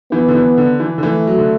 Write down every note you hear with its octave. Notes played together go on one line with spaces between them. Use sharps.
E3 B3
D3
E3
D3
E3
D3
E3 A3
F#3
D3